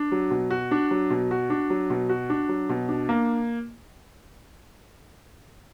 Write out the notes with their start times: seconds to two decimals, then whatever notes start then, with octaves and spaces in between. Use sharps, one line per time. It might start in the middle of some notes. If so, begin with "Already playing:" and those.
Already playing: D4
0.12 F#3
0.31 B2
0.50 F#4
0.71 D4
0.91 F#3
1.10 B2
1.31 F#4
1.50 D4
1.70 F#3
1.90 B2
2.09 F#4
2.30 D4
2.49 F#3
2.69 B2
2.89 D4
3.09 A#3